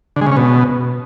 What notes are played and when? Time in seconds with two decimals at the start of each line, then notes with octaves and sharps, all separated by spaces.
0.16 D3
0.21 G#3
0.26 C#3
0.32 C#4
0.37 B2